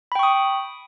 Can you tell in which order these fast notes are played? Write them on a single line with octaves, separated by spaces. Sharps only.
B5 G5 C#6 D#6